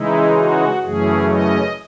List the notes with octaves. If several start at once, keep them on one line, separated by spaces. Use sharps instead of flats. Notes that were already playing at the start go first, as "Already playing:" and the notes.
Already playing: C#3 E3 G#3 D#4 E4
F#4
F#2 C#3 E3 A3 C#4 G#4
D#5